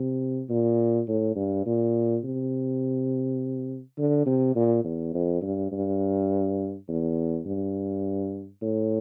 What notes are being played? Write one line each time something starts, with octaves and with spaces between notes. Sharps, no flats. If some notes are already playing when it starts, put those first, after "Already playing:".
Already playing: C3
A#2
A2
G2
A#2
C3
D3
C3
A#2
E2
F2
G2
G2
E2
G2
A2